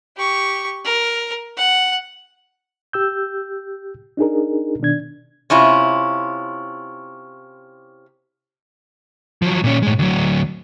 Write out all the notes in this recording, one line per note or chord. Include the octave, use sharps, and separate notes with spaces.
G4 C#6
A#4
F#5
G4 E6 G6
D4 D#4 G#4 A#4
B2 D#3 D4 G#6
C3 C#4 E4 F4
F3 F#3
A#2 C#4
A2 G#3
D2 F#3